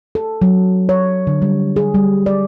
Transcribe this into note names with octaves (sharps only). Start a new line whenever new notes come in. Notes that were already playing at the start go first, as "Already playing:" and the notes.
A4
F#3
C#5
D3
G3
G#4
G3
D5